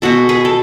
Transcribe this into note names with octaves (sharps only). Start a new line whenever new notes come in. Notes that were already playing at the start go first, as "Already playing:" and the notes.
B2 G#3 B3 F#4 A4
G#4 B4
A4